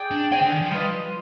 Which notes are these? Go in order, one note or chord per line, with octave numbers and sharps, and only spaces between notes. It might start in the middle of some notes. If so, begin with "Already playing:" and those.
Already playing: G#4 D5 G5
D4
C4 G#4 D5 G5
D3
D#3
F3
G3 F4 B4 D#5